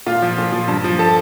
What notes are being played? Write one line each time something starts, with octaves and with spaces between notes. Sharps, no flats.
A#2 F4 F5
F3
A#2
F3
G2
F3
A4 A5